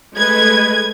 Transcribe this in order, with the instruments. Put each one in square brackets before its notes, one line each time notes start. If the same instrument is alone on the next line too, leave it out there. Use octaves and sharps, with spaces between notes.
[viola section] G#3 A3 B4 [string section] G#6